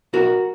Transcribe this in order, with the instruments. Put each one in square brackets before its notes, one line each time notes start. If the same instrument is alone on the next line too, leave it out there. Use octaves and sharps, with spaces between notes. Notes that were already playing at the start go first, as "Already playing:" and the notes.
[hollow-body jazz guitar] B1 F#4 A#4